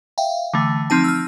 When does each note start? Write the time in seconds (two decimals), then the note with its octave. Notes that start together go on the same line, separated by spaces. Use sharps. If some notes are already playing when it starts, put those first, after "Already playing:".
0.18 E5 F5 G5
0.54 D3 E3 A3
0.90 F3 C4 D#4 A5
1.04 E6 F6